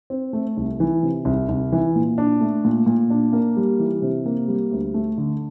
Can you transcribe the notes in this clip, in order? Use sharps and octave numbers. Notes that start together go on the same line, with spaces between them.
C4
A3
C2
E3
C3
C2
C2
E3
A#2
D4
A3
A#2
A#2
D4
A#3
G3
E3
C3
A#3
G3
D2
A3
D3